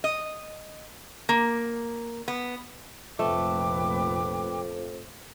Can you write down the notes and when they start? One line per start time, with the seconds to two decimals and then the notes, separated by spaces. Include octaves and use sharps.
0.04 D#5
1.29 A#3
2.28 B3
3.19 F1 A#1 F2 A3 B4 G5 D6